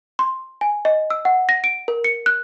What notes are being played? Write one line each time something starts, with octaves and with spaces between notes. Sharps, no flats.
C6
G#5
D#5
E6
F#5
A#6
D7
A#4
C#7
F#6